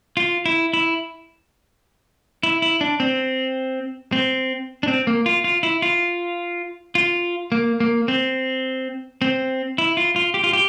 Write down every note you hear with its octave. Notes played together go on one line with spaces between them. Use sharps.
F4
E4
E4
E4
E4
D4
C4
C4
D4
C4
A#3
F4
F4
E4
F4
F4
A#3
A#3
C4
C4
E4
F4
F4
G4
F4
G4